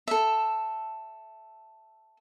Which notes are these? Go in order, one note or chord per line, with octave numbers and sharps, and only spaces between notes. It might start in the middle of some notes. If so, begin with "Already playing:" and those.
A4 E5